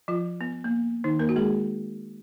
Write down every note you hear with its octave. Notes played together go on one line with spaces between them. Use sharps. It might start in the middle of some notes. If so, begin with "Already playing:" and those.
F3 F4
B3
A#3
D#3 D#4
A#3 A#4
F#4
G#3 G#4